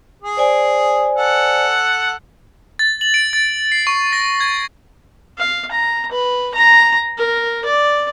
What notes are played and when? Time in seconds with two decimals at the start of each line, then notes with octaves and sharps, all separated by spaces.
0.22 G#4
0.37 C5 D5 G#5
1.18 A4 F#5
2.79 A6
3.01 F#7
3.14 D7
3.33 A6
3.72 C7
3.87 C#6
4.13 A#6
4.40 G#6
5.39 F5
5.72 A#5
6.12 B4
6.55 A#5
7.18 A#4
7.65 D5